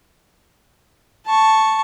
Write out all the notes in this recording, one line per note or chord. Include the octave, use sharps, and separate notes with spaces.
A5 C#6